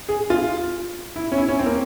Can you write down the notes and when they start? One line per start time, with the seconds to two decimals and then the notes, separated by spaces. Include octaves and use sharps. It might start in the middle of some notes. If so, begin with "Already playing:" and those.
0.09 G#4
0.30 F4
1.16 E4
1.32 C#4
1.38 E4
1.48 C#4
1.59 C4
1.66 A#3